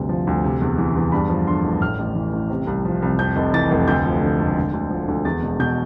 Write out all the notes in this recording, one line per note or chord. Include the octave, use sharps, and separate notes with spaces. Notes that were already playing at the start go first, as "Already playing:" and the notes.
Already playing: G1 D2 C3
F3
D2
C3
E2
E3
E2
G2 B5
F3
D3 C6
A1
A2 F6
A1
E3
A1
C3
C2
F3
C2
F2 G6
F1
E3 A6
F1
D2 G6
F3
D3
E1
D3
D2
F3
D2
E2 A6
E1
B2 G6